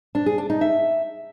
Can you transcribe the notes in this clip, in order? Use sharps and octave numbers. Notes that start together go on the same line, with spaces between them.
D4
G#4
D4
D#4
E5